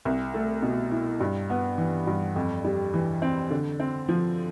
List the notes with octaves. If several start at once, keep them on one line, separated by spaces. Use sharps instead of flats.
C2
A3
B2
E4
G2
B3
E3
G2
F2
G3
E3
C4
D3
C4
F3